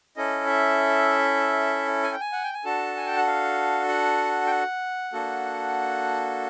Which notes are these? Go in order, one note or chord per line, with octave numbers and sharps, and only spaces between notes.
C#4 E4 A4 D#5
E5
G#5
G5
G#5
F#5
G5
G#5
D4 F#4 A4 A5
G#5
G5
F#5
F5
F#5
G5
F#5
A#3 D4 F#4 A4